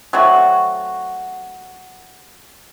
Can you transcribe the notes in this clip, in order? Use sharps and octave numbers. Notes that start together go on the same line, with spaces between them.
F#3 A3 C4 F#4